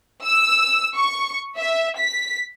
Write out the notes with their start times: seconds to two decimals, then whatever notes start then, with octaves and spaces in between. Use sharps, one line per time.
0.25 E6
0.95 C#6
1.58 E5
1.98 B6